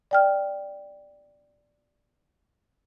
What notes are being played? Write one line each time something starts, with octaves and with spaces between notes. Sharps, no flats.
D5 G5 F6